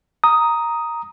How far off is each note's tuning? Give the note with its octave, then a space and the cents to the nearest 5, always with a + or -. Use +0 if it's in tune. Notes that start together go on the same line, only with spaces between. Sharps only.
A#5 +0 D#6 +5